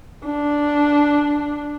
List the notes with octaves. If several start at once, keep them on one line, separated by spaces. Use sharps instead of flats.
D4